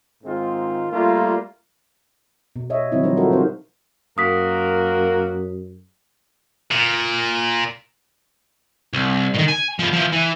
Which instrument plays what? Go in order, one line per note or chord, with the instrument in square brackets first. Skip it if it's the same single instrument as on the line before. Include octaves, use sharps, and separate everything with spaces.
[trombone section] G#2 D#3 G#3 C4 F4
G3 A3 A#3 F4
[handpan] B2
C#5 D#5 E5
D#3 F#3 C4 E4
F3 G3 D#4 C5
F#4 A4 A#4
D3 C4 F#4 C5
[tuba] F#2 [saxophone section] A#3 F#4 A#4 [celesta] D#6 B6
[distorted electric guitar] A#2
C2
A2 D#3
G#5
F3 B3
F3 E4
E3